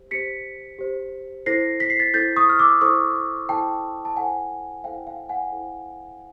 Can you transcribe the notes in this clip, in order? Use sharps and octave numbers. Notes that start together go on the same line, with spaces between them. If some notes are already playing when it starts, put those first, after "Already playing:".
Already playing: G4 C5
G4 C5 B6 C#7
G4 C5
E4 A4 C5 A#6 C7
B6
C7
A6 B6
E4 A4 C5 G6 A6
C#6 D#6
F6
D6 E6
E4 A4 C5 C#6 D#6
E4 A4 C5 G5 A5
A5
E4 A4 C5 F#5 G#5
E4 A4 C5 F5 G5
F5 G5
F#5 G#5
E4 A4 C5